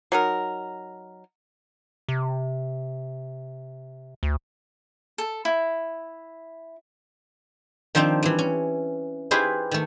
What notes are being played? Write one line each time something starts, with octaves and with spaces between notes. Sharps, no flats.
F#3 D#4 A#4
C3
D2
A4
E4
D#3 F3 C4 D4 D#4
E3 G3
C#4
D#4 E4 G4 G#4 B4 C5
D#3 A3